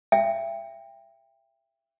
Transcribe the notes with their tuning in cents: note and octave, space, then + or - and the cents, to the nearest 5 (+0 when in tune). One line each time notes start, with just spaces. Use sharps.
E5 +25 G5 +20